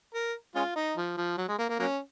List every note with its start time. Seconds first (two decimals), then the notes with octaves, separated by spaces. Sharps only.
0.14 A#4
0.55 G#3 C#4 F4
0.76 D#4
0.97 F3
1.17 F3
1.38 F#3
1.48 G#3
1.59 A#3
1.69 A#3
1.79 F#3 A#3 C#4